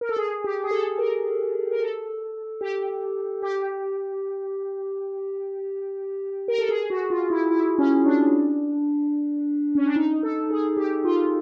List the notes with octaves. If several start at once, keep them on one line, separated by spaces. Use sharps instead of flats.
A#4
A4
G#4
G4
G#4
A4
A#4
A#4
A4
G4
G4
A#4
A4
G#4
F#4
F4
E4
E4
C#4
D4
C#4
D4
D#4
A4
G#4
G4
F4